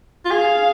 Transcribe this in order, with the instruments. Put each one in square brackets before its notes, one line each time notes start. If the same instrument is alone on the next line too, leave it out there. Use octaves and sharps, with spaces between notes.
[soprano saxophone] F4
[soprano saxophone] G#4 [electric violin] F5